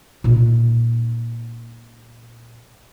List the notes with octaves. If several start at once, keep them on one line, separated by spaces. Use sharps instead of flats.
A#2 D#4